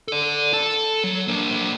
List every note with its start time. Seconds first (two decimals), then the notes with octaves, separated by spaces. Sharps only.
0.08 A4 D5
0.53 A4 A5
1.04 F#3
1.28 A#3 D4